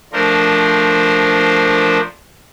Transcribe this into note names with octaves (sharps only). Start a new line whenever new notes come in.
F3 A3 D4 A#4 C5